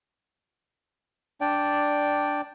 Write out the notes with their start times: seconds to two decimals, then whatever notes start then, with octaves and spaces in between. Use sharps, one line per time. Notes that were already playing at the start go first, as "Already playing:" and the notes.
1.41 D4 D5 G5